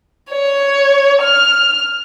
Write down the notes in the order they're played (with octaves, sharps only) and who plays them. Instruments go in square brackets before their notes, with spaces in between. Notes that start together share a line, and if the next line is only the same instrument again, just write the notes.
[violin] C#5
F6